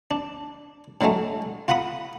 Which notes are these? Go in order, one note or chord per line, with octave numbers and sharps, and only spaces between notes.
D4
A2 D3 F#3 G#3 A3
F4 F#5 A#5 B5 D#6